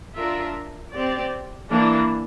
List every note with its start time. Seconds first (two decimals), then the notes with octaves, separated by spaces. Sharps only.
0.16 D4 F4 A#4 E5
0.93 C4 G4 D5
1.69 E3 A#3 D4